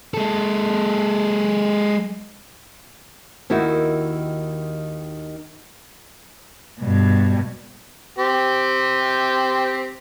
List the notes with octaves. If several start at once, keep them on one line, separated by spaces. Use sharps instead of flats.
G#3 A4
D#2 D#3 E4 F#4
G2 B2
C4 G4